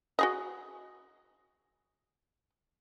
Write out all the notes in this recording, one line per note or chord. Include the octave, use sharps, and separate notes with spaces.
F#4 G#4 D#5